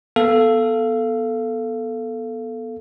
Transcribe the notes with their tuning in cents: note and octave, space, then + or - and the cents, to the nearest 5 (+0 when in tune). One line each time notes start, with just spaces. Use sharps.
B3 -15 A4 +5 F5 -15